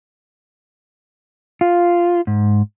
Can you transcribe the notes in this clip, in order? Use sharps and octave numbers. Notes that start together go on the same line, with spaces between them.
F4
G#2